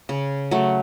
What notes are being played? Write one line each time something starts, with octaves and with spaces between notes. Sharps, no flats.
C#3
F#3 A3